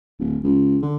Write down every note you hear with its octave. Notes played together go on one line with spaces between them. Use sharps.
D1
C#2
D3